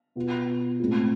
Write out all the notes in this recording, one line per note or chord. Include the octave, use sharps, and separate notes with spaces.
B2 B3 F4
A2 G#3 C4 F4